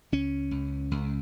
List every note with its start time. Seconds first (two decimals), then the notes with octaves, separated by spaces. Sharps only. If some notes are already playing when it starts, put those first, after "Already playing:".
0.12 C#2 C#4
0.51 C#2
0.91 C#2